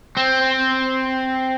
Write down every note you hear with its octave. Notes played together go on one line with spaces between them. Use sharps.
C4